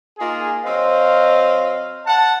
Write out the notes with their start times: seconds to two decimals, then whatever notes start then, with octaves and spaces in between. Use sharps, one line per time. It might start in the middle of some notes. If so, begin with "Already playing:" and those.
0.19 A#3 D#4 F4 G#4
0.65 F#3 C4 C5 D#5 F5
2.06 F#5 A5